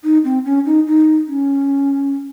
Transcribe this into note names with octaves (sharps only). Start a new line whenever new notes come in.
D#4
C4
C#4
D#4
D#4
C#4